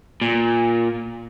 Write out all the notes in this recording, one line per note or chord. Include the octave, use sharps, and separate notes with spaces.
A#2